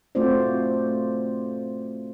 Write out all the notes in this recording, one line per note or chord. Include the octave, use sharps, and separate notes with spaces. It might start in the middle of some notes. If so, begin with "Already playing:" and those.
A3 C4 F4 F#4 C5 D5